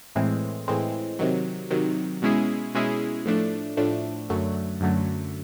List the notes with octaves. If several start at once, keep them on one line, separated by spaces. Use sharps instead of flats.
A2 E3 G#3 C4
A2 E3 G#3 C4
C3 D#3 F#3
C3 D#3 F#3
B2 G#3 C#4 E4 G#4
B2 G#3 C#4 E4 G#4
A2 F3 A3 D4
A2 F3 A3 D4
F#2 D3 F#3 A3
F#2 D3 F#3 A3